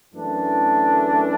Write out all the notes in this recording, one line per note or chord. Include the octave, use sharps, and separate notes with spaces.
F#2 E3 A3 D4